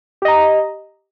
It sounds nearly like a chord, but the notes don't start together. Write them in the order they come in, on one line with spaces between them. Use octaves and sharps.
G4 D#5 A#5